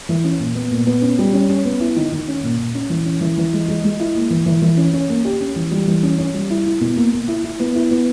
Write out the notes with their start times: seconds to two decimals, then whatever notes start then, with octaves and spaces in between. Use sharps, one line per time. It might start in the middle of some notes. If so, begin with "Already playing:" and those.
0.09 E3
0.24 C#4
0.40 A#2
0.55 B3
0.71 A#2
0.87 B3
1.02 C#4
1.19 G3
1.33 C#4
1.50 C#4
1.65 B3
1.80 E4
1.96 D#3
2.12 D#3
2.28 C#4
2.43 A#2
2.58 A#2
2.75 C#4
2.90 E3
3.06 C#4
3.21 E3
3.37 E3
3.53 G#3
3.68 G#3
3.84 G#3
4.00 E4
4.15 A#3
4.31 E3
4.46 E3
4.62 E3
4.77 C#4
4.93 C#4
5.09 A#3
5.25 G4
5.41 C#4
5.56 E3
5.71 G3
5.87 E3
6.03 C#4
6.18 C#4
6.34 G3
6.50 E4
6.66 E4
6.81 B2
6.96 A#3
7.13 A#3
7.28 E4
7.44 E4
7.60 B3
7.75 E4
7.91 B3